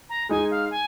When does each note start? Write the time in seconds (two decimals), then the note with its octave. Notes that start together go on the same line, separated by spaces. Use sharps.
0.09 A#5
0.29 G#3 D#4 G#5
0.51 F5
0.71 G#5